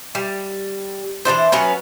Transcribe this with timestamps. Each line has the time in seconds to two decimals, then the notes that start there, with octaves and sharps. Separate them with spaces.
0.15 G3
1.25 E3 G3 D4 C5
1.52 F#3 B3 C#4 B4